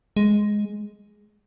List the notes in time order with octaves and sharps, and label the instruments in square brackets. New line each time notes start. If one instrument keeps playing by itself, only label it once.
[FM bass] G#3